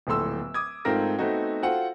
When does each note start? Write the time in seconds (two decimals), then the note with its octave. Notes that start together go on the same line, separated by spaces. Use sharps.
0.07 D1 A#1 A2 A4 C6 E6
0.54 D6 D#6 G#6
0.85 G#2 A3 C4 F4 A#4 A#6
1.19 A3 B3 C4 D#4 F#4
1.62 F4 F#4 A4 C5 F#5 G5